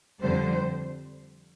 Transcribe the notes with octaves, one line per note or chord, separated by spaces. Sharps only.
F2 D3 G3 C5